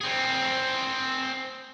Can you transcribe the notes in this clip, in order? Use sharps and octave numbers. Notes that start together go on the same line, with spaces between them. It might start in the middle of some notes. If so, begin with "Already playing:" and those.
C4 G#4